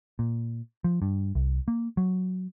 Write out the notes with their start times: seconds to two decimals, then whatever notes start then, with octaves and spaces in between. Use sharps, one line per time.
0.19 A#2
0.84 F3
1.02 G2
1.35 C2
1.68 A#3
1.97 F#3